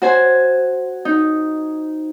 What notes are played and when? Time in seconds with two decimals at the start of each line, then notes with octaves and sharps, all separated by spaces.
0.02 F#4 C5 G#5
1.05 D#4